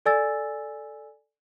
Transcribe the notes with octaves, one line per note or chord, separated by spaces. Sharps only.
A4 D5 G#5 E6 A6